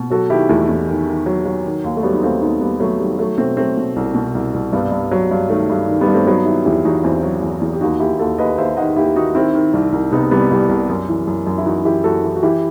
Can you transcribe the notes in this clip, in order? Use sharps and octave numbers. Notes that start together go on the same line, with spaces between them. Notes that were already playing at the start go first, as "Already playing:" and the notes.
Already playing: B2
F#3 F#4 A4
D#3 E4 G4
E2 A3
E2
D#3
D#3
F#3
F#3
D#3
D#2
A3
F#3 G3 B3
D#4
D#2 A3 C4
D#2 B3 D#4
D#2 G3 B3
F#3 A3
D#3 G3
F#3 A3
B2 A3 C4
F#3 A3 C4
B2
C2
B2
C2
C2
G2 G3 B3
G2
F#3
G2
D#3 A3
G2 G3
D#3
G3 B3
G2
A3 C4
F#3 B3 D#4
D#3 E4 G4
E2 E4 G4
E2 D#4 F#4
E2 C4 E4
F#3
E2
E2
G4
D#2 D#4 F#4
D#2 E4 G4
D#2 F#4 A4
D#2 B4 D#5
D#2 C5 E5
D#3 D#5 F#5
D#2 E4 G4
D#3 D#4 F#4
D#3 C4 E4
D#3
C2
C2
C3 B3 D#4
C2 G3 B3
C2 G3
C2
F#2
E3
F#2
F#2
E4
E3 D#4 F#4
E3 E4 G4
F#2 F#4 A4
E3
F#4
E3 E4 G4